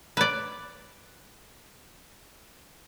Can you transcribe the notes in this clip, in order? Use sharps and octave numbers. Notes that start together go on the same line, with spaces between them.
B4 D5